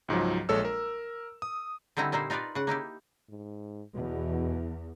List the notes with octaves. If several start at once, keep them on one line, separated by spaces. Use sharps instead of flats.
C#2 G#2 F3 F#3
A#1 G#3 A4 C#5 E6
A#4
D#6
D3 G3 C4 D#4 E4
A#2 G3 A#3 D#4 E4 C5
D#4 F4 A#4 B4 D5
C#3 F#5
A#3 D#4 E4 G4
G#2
E2 B2